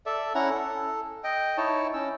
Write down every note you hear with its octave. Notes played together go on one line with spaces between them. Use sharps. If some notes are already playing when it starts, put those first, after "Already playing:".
A4 D5 E5
C#4 E4 F#5 A#5
A4
D#5 G5
D#4 E4 C#5 A5
C#4 E6